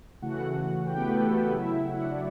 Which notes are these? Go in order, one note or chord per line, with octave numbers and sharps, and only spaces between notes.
C#3 E3 A3 F#4 F#5
G4 G5
B3 B4
A3 A4
A3 A4
B3 B4
C#3 F#3 A3 E4 E5
F#4 F#5
D4 D5